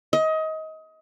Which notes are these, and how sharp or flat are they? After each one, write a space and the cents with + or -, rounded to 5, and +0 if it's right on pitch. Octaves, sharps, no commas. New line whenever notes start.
D#5 +25